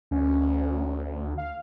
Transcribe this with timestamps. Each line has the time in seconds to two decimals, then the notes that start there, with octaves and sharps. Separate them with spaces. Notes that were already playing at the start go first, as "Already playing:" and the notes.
0.11 D2 C#4
1.37 F5